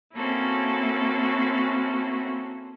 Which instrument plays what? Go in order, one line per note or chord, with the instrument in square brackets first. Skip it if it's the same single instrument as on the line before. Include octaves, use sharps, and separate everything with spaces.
[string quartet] A#3 C4 C#4 E4 F#4 A4